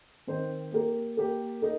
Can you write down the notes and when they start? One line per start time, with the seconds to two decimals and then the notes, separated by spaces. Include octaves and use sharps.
0.27 D#3 C4 D#4 C5
0.72 A#3 G4 A#4
1.17 A#3 G4 A#4
1.62 D#4 A#4